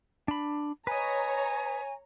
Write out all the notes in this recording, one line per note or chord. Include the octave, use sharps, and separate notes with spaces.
D4 B5
B4 C#5 D#5 G#5 A#5